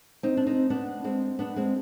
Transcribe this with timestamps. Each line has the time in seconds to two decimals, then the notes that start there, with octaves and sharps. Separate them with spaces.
0.23 C4 D#4
0.37 D4
0.47 C4 D#4
0.70 B3 D4
1.04 G#3 C4
1.39 B3 D4
1.56 G#3 C4